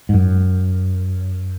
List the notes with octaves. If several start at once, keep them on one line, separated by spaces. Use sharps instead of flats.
G#2
F#2